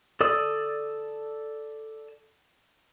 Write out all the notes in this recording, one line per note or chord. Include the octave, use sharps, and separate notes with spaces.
A4 D5 D#6 E6